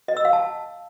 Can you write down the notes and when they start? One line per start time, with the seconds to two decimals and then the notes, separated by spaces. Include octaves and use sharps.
0.08 D#5
0.17 E6
0.25 F5
0.33 A5